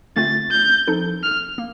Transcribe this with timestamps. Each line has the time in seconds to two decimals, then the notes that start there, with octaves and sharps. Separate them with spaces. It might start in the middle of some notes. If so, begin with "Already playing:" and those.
0.16 D3 A3 C4 F4 A6
0.52 G6
0.87 F3 C4 D#4 A4
1.23 F6
1.58 A#3